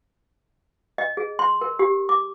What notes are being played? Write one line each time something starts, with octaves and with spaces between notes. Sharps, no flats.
D#5
G#4
C6
A#4
G4
D6